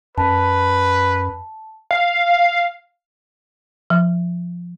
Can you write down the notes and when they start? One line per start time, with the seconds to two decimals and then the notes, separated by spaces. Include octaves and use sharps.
0.18 F#2 B4 A5
1.91 F5
3.90 F3